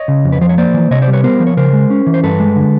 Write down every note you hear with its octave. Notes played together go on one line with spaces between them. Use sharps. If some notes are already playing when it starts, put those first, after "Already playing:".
Already playing: C#5 D#5
C#3
F2
B4
F3 C5
C#5
A#3 C5 D5
E3
C3 C#5 D#5
C5 D5
G3
B4 C#5
B3 A#4 C5
F3
C#5
C#3 A#4 C5
G#3
C#4
E3
C5
G2 A4 B4
G#3
D3